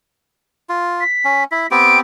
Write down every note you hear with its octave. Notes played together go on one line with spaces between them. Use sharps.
F4
B6
C#4
E4 B6
B3 C4 G4 D7